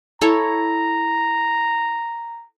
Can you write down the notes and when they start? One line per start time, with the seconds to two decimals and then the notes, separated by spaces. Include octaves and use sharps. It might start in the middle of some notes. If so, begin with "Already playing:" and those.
0.21 E4 A4 C#5 A#5